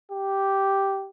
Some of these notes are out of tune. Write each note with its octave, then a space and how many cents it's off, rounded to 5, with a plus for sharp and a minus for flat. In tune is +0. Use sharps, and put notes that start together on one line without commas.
G4 -5